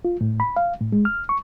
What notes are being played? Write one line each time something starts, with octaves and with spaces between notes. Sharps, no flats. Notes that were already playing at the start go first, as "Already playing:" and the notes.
F4
A2
B5
F5
A2
G#3
F6
C#6